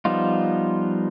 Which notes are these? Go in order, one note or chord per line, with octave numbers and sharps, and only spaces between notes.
F3 G3 B3 D#4 F4